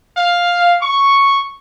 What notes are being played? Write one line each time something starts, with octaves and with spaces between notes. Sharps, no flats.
F5
C#6